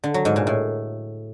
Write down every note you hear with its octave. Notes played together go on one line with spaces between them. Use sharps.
D3
F#3
G#2
A#2
A2